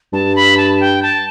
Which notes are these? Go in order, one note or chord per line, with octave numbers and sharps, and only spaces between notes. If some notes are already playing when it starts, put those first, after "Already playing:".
G2 A5
B5
A5
G5
A5